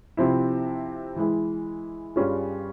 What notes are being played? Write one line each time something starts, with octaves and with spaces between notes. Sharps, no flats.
C3 F3 C4 E4
E3 G#3 E4
G2 G3 C#4 F4 G#4